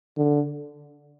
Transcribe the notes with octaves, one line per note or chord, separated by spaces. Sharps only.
D3